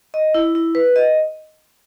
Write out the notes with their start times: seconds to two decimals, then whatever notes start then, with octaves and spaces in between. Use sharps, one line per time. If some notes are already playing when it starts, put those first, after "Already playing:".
0.14 D#5
0.34 E4
0.55 E4
0.75 B4
0.96 D#5